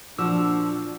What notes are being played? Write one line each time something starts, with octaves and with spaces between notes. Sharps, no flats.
A#2 F3 D4 F#4 D6 E6